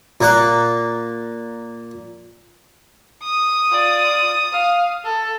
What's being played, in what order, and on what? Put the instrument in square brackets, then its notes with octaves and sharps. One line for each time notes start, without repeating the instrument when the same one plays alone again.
[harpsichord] A#2 A#3 F#5
[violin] D#6
[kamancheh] F4 D5
F5
A4